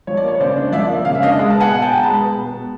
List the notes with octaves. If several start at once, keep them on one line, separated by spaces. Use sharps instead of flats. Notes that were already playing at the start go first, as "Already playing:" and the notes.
F3 C#5
D5
A#3 C#5
C#5
C#3 C5 D5
D4
F3 D5 E5
A#3
C#3 F5
E5
D4 D#5 F5
G#3
A5
B3
F#5 G#5
B2
G5 A5
B2
A#5
G#3 A5 B5
B3
B2
B2